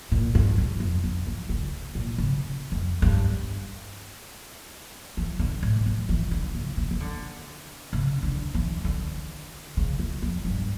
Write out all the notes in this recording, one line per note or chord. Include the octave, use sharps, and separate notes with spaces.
A#2
G2
E2
F2
D3
E3
C#3
A#2
C#3
F2
G2
E3
D3
A2
E3
E3
D3
C#3
C#3
E3
D3
C#3
D3
E3
D3
C#3
E2
F2
G2